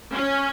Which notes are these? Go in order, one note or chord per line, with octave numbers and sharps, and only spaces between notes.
C#4